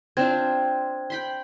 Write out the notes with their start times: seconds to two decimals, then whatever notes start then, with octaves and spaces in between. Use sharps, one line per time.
0.17 C4 D4 F4 C5 G#6
1.10 G5 B5 C6